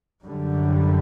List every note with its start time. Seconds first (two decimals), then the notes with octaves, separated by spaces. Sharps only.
0.24 F#2 D3 G3